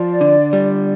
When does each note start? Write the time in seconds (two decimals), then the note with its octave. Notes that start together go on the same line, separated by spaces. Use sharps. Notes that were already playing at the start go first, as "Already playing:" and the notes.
Already playing: F3 D5
0.21 D3
0.53 G3